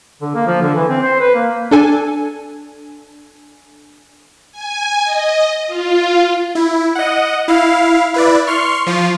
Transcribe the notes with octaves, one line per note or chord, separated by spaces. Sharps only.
D3
A#3
F3
D3
E3
C4
C5
B4
A#3
D4 A4 G#5
G#5
D#5
F4
E4
D#5 F#5
E4 F5
E4 B4 D5
C6 C#6 F6
F3 F4